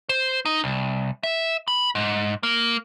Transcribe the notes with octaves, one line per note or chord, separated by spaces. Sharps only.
C5
D#4
C2
E5
B5
G#2
A#3